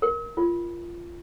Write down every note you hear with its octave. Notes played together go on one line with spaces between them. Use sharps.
A#4
F4